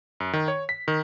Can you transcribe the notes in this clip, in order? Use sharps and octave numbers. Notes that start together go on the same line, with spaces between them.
F#2
D#3
C#5
B6
D#3